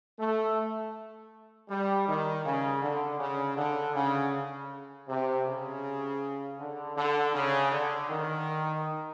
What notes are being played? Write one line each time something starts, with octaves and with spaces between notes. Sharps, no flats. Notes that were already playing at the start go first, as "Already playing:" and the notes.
A3
G3
D#3
C#3
D3
C#3
D3
C#3
C3
C#3
D3
D3
C#3
D3
D#3